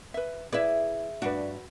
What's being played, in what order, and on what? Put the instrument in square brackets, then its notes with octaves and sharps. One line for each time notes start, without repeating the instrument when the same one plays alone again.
[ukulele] B4 E5
[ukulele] E4 B4 D5 [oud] G#4 E5
[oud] G2 D4 [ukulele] F#4 B4